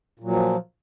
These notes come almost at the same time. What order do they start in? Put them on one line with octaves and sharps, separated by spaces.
A#2 F#3 F3